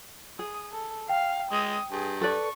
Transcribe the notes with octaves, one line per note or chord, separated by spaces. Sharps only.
G#4 D#6
A4
F5 G5
G#3 D#6
G2 G#4
A4 B4 D5 C#6